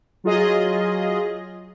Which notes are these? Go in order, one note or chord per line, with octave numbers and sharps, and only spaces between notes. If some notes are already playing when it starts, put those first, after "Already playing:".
F#3 F4 G#4 D#5